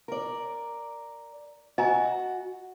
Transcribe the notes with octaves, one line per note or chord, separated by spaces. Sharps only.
A#4 D5
F#4 D#5 G#5 A#5